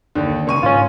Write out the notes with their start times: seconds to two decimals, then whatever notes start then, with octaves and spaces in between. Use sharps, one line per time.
0.15 D#2 D3
0.47 C#2 C#6 D#7
0.63 G#2 C#4 F4